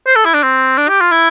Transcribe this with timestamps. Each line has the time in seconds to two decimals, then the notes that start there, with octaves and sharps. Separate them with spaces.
0.07 C5
0.16 A4
0.25 E4
0.34 D4
0.43 C4
0.78 D4
0.89 G4
1.01 F4
1.12 E4